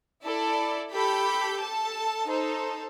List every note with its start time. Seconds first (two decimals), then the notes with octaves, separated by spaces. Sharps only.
0.23 E4 A4 D5
0.92 G4 A4 B5 G6
1.60 A4 A5
2.25 D#4 A4 C5